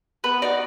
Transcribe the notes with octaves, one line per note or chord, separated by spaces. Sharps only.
B3 B4
D#4 F#4 D5